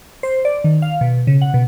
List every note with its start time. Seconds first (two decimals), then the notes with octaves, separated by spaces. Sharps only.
0.23 C5
0.45 D5
0.64 D#3
0.82 F5
1.01 B2
1.27 C#3
1.41 F#5
1.54 B2